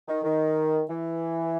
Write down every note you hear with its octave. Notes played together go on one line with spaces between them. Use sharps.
D#3
D#3
E3